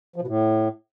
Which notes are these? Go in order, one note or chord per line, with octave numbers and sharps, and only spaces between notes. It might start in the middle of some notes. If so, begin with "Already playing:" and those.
F3
B2
A2